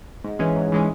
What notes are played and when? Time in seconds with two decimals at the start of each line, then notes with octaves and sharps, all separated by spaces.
0.24 G#2
0.39 E3 G#3 C#4
0.56 G#2
0.72 E3 G#3 C#4